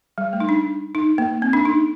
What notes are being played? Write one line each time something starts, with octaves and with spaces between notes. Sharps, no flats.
G3
A3
D#4
D4
D#4
A#3
C4
D4
D#4